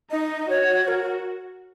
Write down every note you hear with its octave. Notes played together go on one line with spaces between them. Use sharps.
D#4 D#5
F#4 C#5
A#4